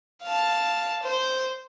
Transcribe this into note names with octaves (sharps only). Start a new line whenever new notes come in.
F5 A5
C5